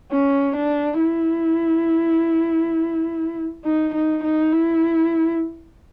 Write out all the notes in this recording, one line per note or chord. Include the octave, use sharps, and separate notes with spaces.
C#4
D4
E4
D#4
D#4
D#4
E4